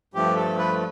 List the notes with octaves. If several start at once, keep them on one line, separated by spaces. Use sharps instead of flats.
G2 F3 A3 G4
A4
B4